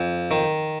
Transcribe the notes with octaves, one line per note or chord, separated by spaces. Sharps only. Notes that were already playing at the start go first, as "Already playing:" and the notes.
Already playing: F2
D#3